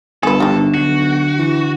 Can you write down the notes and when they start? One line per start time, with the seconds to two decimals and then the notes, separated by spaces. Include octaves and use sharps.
0.23 G1 G#4 A4 B4
0.40 D2 G3 D#4
0.74 B1 F#4
1.39 E3